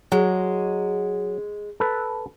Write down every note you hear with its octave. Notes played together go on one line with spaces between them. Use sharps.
F#3 G#3
A4 B4